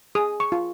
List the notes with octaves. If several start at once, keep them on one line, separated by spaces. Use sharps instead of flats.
G#4 D#6
C#6
F4